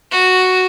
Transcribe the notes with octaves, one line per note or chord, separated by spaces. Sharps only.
F#4